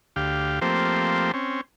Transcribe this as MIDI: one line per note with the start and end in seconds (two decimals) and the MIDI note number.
0.16 0.60 38
0.16 0.60 67
0.16 0.60 77
0.61 1.32 53
0.61 1.32 57
0.61 1.32 58
0.61 1.32 60
0.61 1.32 67
0.61 1.32 72
1.34 1.61 60
1.34 1.61 61